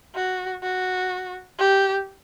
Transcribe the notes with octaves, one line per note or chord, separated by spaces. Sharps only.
F#4
F#4
G4